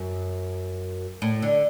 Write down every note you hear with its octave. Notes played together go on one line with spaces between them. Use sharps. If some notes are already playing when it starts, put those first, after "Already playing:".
Already playing: F#2
A2
D3